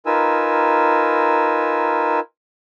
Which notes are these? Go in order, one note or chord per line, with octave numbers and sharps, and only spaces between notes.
D#4 F4 A#4 B4 G#5 E6